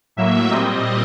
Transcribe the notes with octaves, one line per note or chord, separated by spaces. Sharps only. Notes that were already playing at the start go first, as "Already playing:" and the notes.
A2 F#3 A#3 E5
A#2 G3 C4 D#5